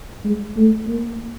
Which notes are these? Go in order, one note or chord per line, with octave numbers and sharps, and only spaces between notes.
G#3
A3
A#3